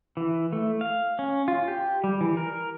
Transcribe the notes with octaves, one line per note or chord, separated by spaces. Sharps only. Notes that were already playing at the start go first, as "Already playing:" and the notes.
E3
A3
F5
C#4
F4
G4
G3
E3
A#4